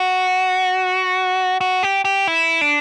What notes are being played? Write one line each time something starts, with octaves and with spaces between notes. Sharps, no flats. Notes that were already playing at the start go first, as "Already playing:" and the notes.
Already playing: F#4
F#4
G4
G4
E4
D4